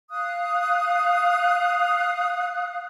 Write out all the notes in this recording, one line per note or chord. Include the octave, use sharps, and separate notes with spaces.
F5 D#6 F#6